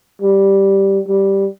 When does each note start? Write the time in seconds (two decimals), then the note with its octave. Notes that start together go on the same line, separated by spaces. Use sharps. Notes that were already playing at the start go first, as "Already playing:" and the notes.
0.22 G3
1.08 G3